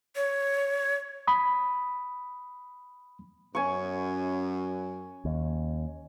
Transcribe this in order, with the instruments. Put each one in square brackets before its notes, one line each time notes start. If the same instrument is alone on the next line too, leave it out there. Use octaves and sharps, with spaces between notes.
[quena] C#5
[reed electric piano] B5 D#6
[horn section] F#2 [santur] C#4 G#5 C#6
[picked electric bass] D#2